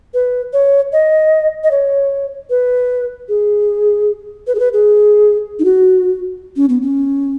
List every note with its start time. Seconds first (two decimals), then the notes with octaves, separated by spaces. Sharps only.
0.14 B4
0.53 C#5
0.93 D#5
1.64 D#5
1.71 C#5
2.50 B4
3.29 G#4
4.47 B4
4.55 G#4
4.60 B4
4.73 G#4
5.59 D#4
5.65 F#4
6.56 C#4
6.69 B3
6.82 C#4